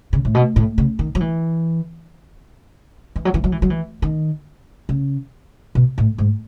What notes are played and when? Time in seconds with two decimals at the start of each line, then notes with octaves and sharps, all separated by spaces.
0.13 C#3
0.25 A2
0.35 B2
0.56 A2
0.78 C#3
0.99 D#3
1.15 F#3
1.20 E3
3.16 E3
3.25 F#3
3.34 E3
3.44 F#3
3.52 E3
3.62 F#3
3.70 E3
4.02 D#3
4.89 C#3
5.75 B2
5.98 A2
6.18 G#2